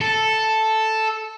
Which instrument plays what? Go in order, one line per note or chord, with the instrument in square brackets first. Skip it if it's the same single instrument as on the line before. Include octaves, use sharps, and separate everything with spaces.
[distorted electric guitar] A4